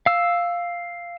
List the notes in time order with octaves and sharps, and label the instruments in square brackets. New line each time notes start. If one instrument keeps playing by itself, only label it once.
[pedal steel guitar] F5 E6